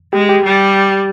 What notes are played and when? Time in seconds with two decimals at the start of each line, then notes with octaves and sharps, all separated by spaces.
0.13 G#3 G4
0.29 G4
0.44 G3